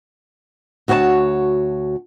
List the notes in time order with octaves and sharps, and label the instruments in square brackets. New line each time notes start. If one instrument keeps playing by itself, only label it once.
[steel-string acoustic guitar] D2 F#4 C#5 G#5 A5